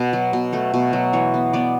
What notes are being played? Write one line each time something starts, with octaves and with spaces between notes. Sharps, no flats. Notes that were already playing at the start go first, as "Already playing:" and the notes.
Already playing: B2 B3
F#3
B2
A3 A4
B2
F#3
E3 C#5
B3
B3 D5